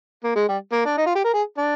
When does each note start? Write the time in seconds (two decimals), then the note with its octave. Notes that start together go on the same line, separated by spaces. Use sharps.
0.24 A#3
0.36 G#3
0.49 G3
0.72 A#3
0.85 D4
0.97 D#4
1.06 F4
1.15 G4
1.25 A#4
1.34 G#4
1.58 D4